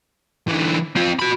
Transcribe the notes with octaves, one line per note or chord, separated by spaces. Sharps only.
D3 E3
C4 F4
F#4 B5